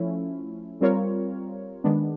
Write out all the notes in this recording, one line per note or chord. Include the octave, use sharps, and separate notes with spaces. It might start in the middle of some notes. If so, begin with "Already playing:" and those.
Already playing: F3 A3 C#4 E4
G3 C4 F4 A#4 C#5
D#3 G#3 B3 D4